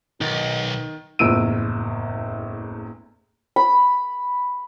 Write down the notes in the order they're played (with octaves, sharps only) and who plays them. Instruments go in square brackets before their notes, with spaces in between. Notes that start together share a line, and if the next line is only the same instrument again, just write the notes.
[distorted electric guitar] B1 [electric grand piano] D#3 [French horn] D#4
[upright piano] F#1 E2 A2 E6 D7 D#7
[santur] B5